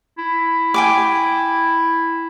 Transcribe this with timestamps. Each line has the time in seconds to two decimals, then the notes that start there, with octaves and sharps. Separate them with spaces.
0.18 E4
0.74 G5 G#5 D6